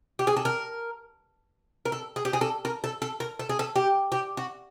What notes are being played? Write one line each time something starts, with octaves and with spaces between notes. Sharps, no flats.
G4
G#4
A4
A#4
A#4
A4
G#4
G4
G#4
A4
A#4
A4
A4
A#4
A4
G#4
A4
G4
G4
F#4